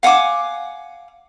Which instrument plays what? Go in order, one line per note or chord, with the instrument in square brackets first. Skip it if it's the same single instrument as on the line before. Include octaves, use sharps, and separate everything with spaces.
[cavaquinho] F5 F#5 G#5 D6